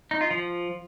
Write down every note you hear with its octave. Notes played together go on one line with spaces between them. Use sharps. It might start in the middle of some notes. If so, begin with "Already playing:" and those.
D#4
F4
F3